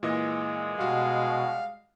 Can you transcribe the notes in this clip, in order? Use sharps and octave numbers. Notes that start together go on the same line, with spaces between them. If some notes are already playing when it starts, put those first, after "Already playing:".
A#2 E3 G#3 D#5
B2 G3 F#4 F5